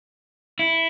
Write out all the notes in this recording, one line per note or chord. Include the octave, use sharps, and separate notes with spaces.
E4